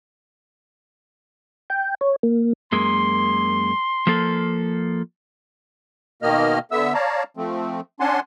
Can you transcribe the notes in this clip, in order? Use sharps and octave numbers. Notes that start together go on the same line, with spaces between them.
G5
C#5
A#3
F#2 G#3 A#3 C6
F3 A#3 A4
B2 D#3 A#3 D#5 F6
D3 B3 E5 E6
C#5 D5 F5 A5 A#5
F3 A3 C4
C#4 D4 F#5 G#5 A5 C6